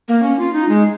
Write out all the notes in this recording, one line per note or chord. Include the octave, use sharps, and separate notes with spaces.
A#3
C#4
F4
D#4
G#3